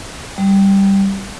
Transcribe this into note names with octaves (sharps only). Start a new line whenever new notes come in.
G3